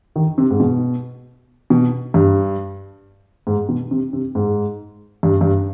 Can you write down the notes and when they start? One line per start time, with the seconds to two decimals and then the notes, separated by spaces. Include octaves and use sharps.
0.16 D#3
0.38 C3
0.50 G#2
0.60 B2
1.70 B2
2.14 G2
3.47 G#2
3.69 B2
3.91 C3
4.13 C3
4.35 G#2
5.23 G2
5.41 G2